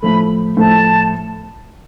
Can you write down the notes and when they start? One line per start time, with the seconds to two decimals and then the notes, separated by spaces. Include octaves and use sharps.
0.02 A2 F3 A3 B5
0.57 A2 F3 A3 A5